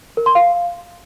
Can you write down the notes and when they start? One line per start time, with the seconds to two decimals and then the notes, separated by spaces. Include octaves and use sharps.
0.17 A#4
0.26 C6
0.35 F5